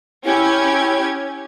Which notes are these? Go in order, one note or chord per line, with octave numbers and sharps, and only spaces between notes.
C#4 E4 G4 G#6